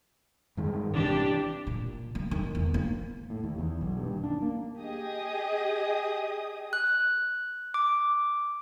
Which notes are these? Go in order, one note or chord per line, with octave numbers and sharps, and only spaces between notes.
G2 D#3 G#3
A1 C3 E3 D4 G4
A#2
A#3
D#3
E2
A#3
A2
D#2
E2
B1
G2
D#2
D4
A#3
G4 G#4 D#5 D#6
F#6
D6